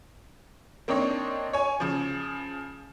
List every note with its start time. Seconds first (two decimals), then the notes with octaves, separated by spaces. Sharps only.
0.88 A#3 C4 D4 D#4 C#5 D#5
1.53 C#5 G#5
1.80 C#3 F3